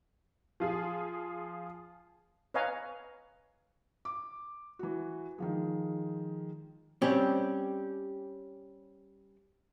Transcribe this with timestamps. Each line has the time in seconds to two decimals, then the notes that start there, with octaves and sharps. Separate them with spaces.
0.60 F3 F4 G#4
2.54 B4 C#5 D#5 F5 G#5 A#5
4.05 D6
4.79 E3 F#4
5.38 D#3 F3 G#3
7.02 G3 C4 C#4 G4